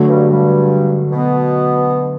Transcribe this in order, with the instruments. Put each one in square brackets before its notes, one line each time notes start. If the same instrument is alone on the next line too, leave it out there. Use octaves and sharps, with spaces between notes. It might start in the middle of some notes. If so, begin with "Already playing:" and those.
Already playing: [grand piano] D3 F#3 A3
[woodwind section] G2 G3
G2 G3
B2 B3